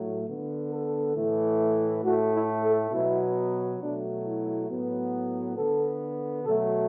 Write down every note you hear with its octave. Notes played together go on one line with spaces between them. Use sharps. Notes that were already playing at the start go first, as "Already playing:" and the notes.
Already playing: A2 F#3 A3
D3 B3
A4
A2 E3 A3
A2 A3 F#4
E4
A4
B2 F#3 B3 E4
B2 F#3 A3 D4
E4
A2 F#3 B3
D3 B3 A4
B2 F#3 A3 A4